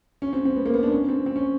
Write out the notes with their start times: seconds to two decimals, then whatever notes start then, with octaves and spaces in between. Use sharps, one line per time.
0.22 C#4
0.33 C4
0.45 C4
0.56 B3
0.66 A#3
0.74 B3
0.83 D4
0.92 C#4
1.09 C4
1.26 C4
1.36 C#4